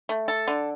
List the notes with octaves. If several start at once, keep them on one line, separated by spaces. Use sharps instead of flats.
A3
A4
D3